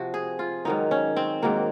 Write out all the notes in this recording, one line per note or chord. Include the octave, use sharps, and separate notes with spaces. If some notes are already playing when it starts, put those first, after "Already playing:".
Already playing: C3 F3 F#4
G#4
F4
G#2 D#3 F#3 D#4
C#4
C4
G#2 D#3 F#3 A#3